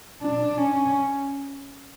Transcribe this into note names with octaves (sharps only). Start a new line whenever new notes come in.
D4
C#4